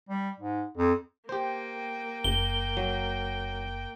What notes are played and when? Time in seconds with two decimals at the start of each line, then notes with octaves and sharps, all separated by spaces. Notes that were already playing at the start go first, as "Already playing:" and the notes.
0.09 G3
0.40 G#2
0.77 F2
1.29 A#3 G4 C5 G5
2.24 F#1 G7
2.77 F#3